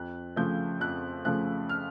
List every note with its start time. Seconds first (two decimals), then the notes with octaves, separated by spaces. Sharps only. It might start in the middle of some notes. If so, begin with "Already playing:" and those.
Already playing: F2 F#6
0.36 C#3 F3 A3 G6
0.80 F2 F#6
1.25 C#3 F3 A3 F#6
1.69 F6